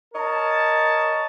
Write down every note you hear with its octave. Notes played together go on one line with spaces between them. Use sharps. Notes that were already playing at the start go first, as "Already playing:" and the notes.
A#4 C#5 D#5 A5